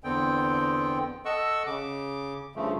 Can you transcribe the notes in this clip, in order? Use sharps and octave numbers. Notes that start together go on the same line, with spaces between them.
E2 D3 B3 C4 G5
A4 D#5 F#5 C#6 E6
C#3 D6
G2 C#3 F3 A3